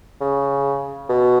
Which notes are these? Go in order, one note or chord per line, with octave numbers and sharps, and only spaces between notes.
C#3
B2